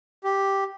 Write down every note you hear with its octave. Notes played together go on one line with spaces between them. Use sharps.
G4